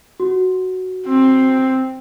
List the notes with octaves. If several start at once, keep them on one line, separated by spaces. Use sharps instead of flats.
F#4
C4